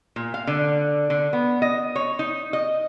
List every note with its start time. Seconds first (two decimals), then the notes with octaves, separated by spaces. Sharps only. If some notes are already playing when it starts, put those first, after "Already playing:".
0.16 A#2
0.34 F5
0.47 D3
1.10 D3
1.33 B3
1.62 D#5
1.96 C#5
2.19 D#4
2.53 D#5